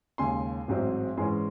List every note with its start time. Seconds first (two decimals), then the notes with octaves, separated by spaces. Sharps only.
0.18 D#2 C#3 G#3 G#5 C6
0.68 A1 G#2 F#3 C4
1.17 G#2 E3 G#3 C#4 G#5 C6